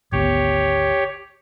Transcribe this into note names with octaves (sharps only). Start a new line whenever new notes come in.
G#1 D2 B3 G4 C#5